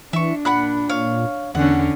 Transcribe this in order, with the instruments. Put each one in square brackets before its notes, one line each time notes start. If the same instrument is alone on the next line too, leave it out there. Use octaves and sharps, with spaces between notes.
[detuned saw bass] E3 [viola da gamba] D4 [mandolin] E5 C#6
[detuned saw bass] A#2 [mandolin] F#5 B5 F#6
[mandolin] C#5 F5
[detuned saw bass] E2 [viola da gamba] D3 C#4 [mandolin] F#5